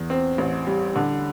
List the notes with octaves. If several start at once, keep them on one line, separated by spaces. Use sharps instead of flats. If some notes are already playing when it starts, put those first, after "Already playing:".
Already playing: E2
C4
A1
G3
D3